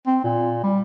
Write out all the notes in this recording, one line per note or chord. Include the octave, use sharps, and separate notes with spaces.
C4
A#2
G3